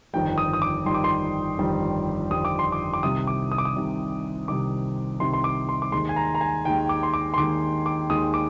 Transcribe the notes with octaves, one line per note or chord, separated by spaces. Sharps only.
G1 F2 D#3 G3 G5
D#6
D#6
D6
G1 F2 D#3 G3 C6
D6
C6
G1 F2 D#3 G3
G1 F2 D#3 G3 D#6
D6
C6
D6
D6
C2 C3 D#3 D#6
D6
D#6
D6
D#6
C2 C3 D#3
C2 C3 D#3 D6
C2 C3 D#3 C6
C6
D6
C6
D6
D#2 D#3 G#3 C6
G#5
A#5
A#5
G#5
D#2 D#3 G#3 G5
D6
C6
D6
C6
D#2 D#3 G#3 D6
D6
D#2 D#3 G#3 D#6
D6